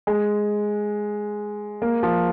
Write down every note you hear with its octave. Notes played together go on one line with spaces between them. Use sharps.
G#3
A#3
F3